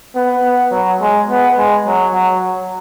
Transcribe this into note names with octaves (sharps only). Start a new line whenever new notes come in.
B3
B3
F#3
G#3
B3
G#3
F#3
F#3